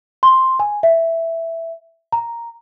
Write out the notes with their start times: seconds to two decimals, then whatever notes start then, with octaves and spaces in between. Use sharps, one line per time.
0.23 C6
0.60 G#5
0.83 E5
2.12 A#5